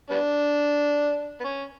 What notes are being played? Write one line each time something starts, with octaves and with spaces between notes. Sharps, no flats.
G3 B3 D4
B3
C#4